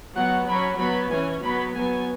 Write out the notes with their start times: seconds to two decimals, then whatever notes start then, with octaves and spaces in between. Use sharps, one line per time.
0.16 F#3 B3 F#5
0.48 F#3 C#4 B5
0.79 F#3 B3 B5
1.11 E3 C#4 G#5
1.43 F#3 B3 B5
1.75 F#3 B3 G#5